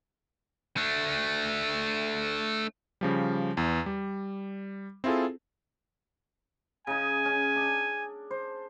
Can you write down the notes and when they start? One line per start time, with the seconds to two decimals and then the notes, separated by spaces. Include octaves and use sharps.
0.77 A3 D4
3.01 C#3 F3 G3
3.57 E2
3.86 G3
5.04 C4 E4 F4 G#4 A4
6.87 C#3 D#4 G#5
7.25 C#4
7.56 D4
8.31 C5